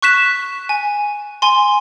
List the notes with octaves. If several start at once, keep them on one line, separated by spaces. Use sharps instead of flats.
C#6 F#6 B6 E7
G#5
G#5 C6